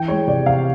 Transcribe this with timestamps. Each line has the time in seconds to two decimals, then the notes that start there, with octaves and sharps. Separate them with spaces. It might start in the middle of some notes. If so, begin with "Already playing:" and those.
Already playing: E3 G5
0.08 G#3 C#5
0.28 C3 D5
0.46 C3 F5